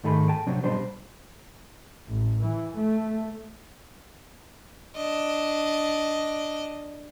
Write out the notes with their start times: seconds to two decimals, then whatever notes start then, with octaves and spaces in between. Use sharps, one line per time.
0.04 G#2 D#3 A3 G#4 B5
0.28 G5 A5
0.47 C3 F#3 C4 D4
0.64 B2 G3 D4 C5
2.08 A1
2.41 E3
2.77 A3
4.96 D4 D#5